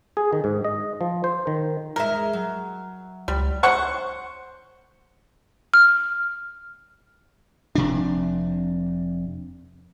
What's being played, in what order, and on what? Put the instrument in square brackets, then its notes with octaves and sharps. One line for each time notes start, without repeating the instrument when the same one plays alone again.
[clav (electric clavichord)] G#4
D#3
G#2
D#5
F3
C5
D#3
[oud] E2 G#3 E5 [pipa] A#4
[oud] F#3
[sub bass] C#2 [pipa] G3
[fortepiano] C5 F#5 C#6
[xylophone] F6
[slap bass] F1 C3 D4